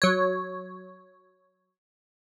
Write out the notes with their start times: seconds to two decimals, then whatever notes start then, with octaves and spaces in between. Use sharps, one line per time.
0.02 F#3 C#5